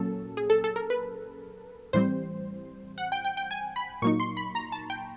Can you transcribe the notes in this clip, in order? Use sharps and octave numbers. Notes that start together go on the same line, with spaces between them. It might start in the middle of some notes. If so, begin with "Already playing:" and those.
Already playing: A#2 F#3 A#3 C#4 A4
G#4
A4
A4
A#4
B4
A2 E3 G3 C4 C5
F#5
G5
G5
G5
G#5
B5
A#2 F#3 A#3 D#4 C#6
C6
B5
A#5
A5
G5